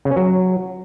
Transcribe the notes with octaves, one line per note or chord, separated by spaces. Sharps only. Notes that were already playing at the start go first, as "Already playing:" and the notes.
C#3
C#4
F#3